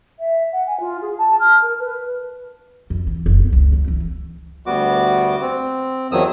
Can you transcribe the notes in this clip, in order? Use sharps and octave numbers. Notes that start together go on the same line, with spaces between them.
E5
F#5
G#5
F4
G#4
A5
F6
A#4
B4
F2
E3
F#1
B3
C#2
C#3
E3
D2 G3 B3 F#4 D6
C4
E2 D#3 F3 F#3 D#6 E6